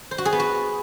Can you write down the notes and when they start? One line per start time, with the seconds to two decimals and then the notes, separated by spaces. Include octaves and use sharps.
0.11 C5
0.18 F#4
0.25 G#4
0.32 B3
0.40 F#4